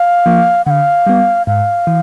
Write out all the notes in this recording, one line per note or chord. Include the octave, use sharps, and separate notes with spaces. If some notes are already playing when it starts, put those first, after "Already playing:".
Already playing: F5
F3 A#3
D3 F5 F#5
G3 B3
G#2 F5
E3